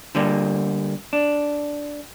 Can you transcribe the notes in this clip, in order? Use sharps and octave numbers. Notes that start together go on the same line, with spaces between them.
D3 G3 A#3
D4